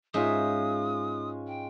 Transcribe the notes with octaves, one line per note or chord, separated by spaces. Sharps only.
G#2 G#3 C#4 F4 E5 D#6
G5